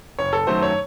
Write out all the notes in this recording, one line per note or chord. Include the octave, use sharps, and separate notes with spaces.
F#1 C#5
A4
F#2 D#3 F#3 A3 C5
C#5